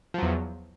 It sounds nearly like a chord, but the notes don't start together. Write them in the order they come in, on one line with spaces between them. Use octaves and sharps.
F3 F#3 E2